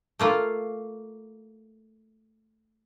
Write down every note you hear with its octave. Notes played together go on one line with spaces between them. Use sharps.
A3 A#3 F4